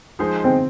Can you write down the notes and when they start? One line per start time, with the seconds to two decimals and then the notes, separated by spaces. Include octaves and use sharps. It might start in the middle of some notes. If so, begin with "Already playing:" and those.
0.19 F3 G#3 D#4 G#4 C5
0.44 C4